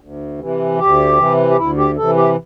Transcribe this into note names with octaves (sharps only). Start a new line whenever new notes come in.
D2
C3 E3
D2 G4
C3 E3
G4
D2 E4
G4
C3 E3 A4
G4